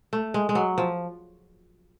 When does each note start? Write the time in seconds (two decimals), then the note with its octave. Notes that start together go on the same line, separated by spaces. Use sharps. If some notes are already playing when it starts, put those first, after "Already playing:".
0.13 A3
0.34 G#3
0.49 G#3
0.55 F#3
0.78 F3